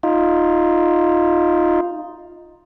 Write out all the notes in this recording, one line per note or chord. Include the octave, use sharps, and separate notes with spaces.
D#4 F4